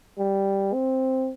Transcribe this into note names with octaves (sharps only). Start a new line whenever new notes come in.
G3
C4